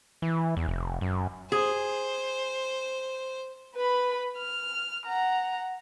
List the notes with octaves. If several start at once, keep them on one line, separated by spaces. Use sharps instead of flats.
E3
E2
F1
F#2
G#4 C5
B4 B5
F6
F#5 A#5